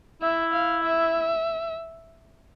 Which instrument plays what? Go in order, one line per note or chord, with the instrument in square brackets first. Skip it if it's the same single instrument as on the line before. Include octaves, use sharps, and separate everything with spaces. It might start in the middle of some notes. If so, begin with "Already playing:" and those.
[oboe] E4 [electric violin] E5
[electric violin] F5
E5